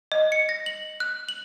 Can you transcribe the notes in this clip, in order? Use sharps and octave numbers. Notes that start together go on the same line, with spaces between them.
D#5
C#7
A#6
F#7
F#6
F#7